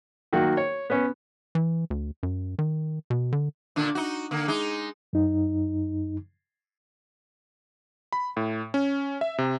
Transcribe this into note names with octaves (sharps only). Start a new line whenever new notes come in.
D#3 F#3 A#3 F#4
C#5
B3 C#4
E3
D2
F#2
D#3
B2
D3
A#2 D3 D4
D#4 F#4
D3 A#3
G#3 D#4
F#2 D#4
B5
A2
C#4
E5
C3